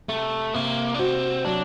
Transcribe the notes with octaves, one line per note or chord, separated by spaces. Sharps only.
C3 A3
C3 A#3
D4
C4 F#4
F#3 D4